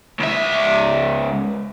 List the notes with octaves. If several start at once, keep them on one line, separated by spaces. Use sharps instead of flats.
C#2 E5